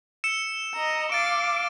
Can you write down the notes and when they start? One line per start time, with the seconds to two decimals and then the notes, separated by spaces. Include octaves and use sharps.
0.24 E6 C#7 E7
0.75 D#5 A#5
1.12 F5 D6 A6 D7